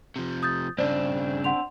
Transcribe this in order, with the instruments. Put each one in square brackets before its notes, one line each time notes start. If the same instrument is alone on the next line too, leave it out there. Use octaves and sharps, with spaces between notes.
[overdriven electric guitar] C3 F3
[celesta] D#6 G6 A6
[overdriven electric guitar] G2 C#3 [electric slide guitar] C4 D4 [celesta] C5 D5
[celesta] F#5 C6 F7